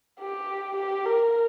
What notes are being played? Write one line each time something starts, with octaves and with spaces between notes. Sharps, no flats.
G4
G4
A#4